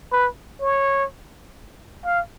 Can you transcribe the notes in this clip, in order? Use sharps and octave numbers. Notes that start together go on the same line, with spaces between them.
B4
C#5
F5